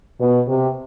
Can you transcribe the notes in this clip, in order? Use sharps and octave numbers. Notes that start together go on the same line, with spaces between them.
B2
C3